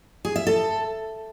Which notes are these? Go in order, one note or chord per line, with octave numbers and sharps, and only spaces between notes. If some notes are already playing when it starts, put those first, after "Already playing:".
G#4
E5
A4